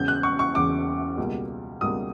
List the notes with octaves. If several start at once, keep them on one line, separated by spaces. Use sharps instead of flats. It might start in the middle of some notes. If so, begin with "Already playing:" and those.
Already playing: E1 E2 C#3 G6
F#6
C#6
C#6
E1 E2 C#3 D6
C#2 B2 G3 A#3
C#2 B2 G3 A#3 D#6